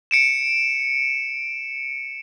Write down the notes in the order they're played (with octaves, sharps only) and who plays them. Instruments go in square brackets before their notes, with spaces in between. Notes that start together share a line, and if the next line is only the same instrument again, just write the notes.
[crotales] C#7 D7 E7